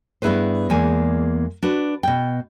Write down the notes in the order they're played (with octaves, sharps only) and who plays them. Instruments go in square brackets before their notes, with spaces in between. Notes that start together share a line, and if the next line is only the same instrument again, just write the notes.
[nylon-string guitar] G2 B3 E4 G#4 B4 C5
E2 G#3 A#3 G#5
D4 F#4 B4
B2 G5